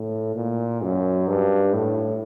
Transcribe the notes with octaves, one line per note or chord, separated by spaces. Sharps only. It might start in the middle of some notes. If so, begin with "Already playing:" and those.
Already playing: A2
A#2
F#2
G2
A2